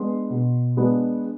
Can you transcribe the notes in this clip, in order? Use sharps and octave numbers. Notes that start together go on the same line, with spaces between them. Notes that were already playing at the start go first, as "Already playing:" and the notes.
Already playing: G#3 B3 D4 C6
B2
G#3 B3 D4